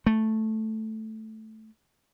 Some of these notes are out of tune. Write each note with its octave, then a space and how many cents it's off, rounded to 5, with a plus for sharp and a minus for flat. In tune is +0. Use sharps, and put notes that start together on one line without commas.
A3 -5